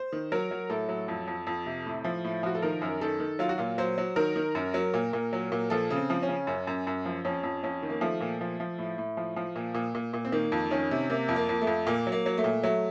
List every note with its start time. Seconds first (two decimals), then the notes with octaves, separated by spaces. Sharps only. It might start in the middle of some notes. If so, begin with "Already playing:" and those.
Already playing: C5
0.12 D#3
0.32 F#3 A#4
0.51 F#3
0.70 A2 A4
0.89 F#3
1.08 F2
1.27 F2
1.47 F2
1.66 C3
1.86 A2
2.04 F3
2.24 A2
2.43 F3 F#4
2.55 A4
2.62 D#3 A#4
2.82 F#2
3.01 D#3 A4
3.20 D#3
3.39 F#3 F4
3.49 F#4
3.58 A#2 F4
3.78 F#3 C5
3.98 F#3
4.16 D#3 A#4
4.36 D#3
4.55 F#2
4.74 F#3
4.94 A#2
5.13 A#2
5.33 F#3
5.52 A#2
5.70 F3 A4
5.90 C#3
5.96 C4
6.10 F3
6.22 C#4
6.29 C#3
6.47 F#2
6.67 F#2
6.87 F#2
7.05 F3
7.25 F2 C#4
7.43 F2
7.63 F2 C#4
7.83 D#3
7.90 A#3
8.01 F3 A3
8.21 A#2
8.41 F3
8.60 F3
8.78 A2
8.98 A2
9.17 F3
9.36 F3
9.56 A#2
9.74 A#2
9.95 A#2
10.13 A#2
10.25 C4
10.32 D#3 A#3
10.52 F2
10.71 D#3 C#4
10.91 C3
11.10 C3 A#3
11.29 F2
11.36 A#3
11.49 F2
11.61 A3
11.67 F2
11.87 A#2 A#3
12.07 F#3
12.12 A#3
12.26 F#3
12.38 A3
12.44 A#2
12.63 F#3 A3